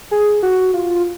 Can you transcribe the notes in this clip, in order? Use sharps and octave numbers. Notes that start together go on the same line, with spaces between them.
G#4
F#4
F4